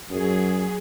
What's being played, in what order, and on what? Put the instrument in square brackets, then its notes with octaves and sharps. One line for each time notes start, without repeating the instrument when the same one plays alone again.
[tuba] F#2 [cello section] F#3 G#4